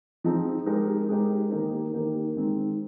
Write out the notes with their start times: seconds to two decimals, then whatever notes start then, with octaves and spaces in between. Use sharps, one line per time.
0.24 F3 C4 D#4 G#4
0.66 G#3 D#4 G4 A#4
1.09 G#3 D#4 G4 A#4
1.51 D#3 A#3 D#4 G4 A#4
1.93 D#3 A#3 D#4 G4 A#4
2.36 D#3 G#3 C4 D#4